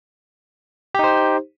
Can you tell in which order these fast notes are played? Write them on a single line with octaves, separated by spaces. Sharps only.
G4 D#4 C5